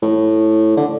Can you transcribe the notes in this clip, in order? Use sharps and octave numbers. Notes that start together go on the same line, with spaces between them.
A2
D3